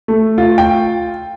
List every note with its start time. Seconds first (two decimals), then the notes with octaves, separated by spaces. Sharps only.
0.08 A3
0.38 F4
0.58 G5